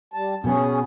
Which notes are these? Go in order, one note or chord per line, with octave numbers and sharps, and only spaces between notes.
G3 A5
B2 B3 C#4 G#4